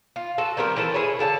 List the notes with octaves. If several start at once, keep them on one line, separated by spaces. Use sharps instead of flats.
F4
F4 F#4 A4
D#3 G3 C4 A#4
E3 C4 A4 A5
E4 G#4 B4 C#5
D3 A4 F#5 A5